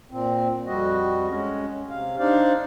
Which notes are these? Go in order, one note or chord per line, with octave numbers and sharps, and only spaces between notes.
A#2 C4
F2 G3 F#4 D#5
G#3 C#4
C3 F5
D4 D#4 C5 D5 F5